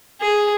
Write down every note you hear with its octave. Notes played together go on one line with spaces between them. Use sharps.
G#4